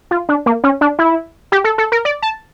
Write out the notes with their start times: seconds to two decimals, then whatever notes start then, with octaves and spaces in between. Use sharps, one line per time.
0.11 F4
0.29 D4
0.46 A#3
0.64 C#4
0.81 D4
0.99 E4
1.52 G4
1.64 A4
1.78 A4
1.92 A#4
2.05 D5
2.22 A5